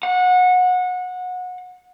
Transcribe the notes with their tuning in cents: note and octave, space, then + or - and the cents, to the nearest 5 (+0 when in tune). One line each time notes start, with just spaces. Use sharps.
F#5 -25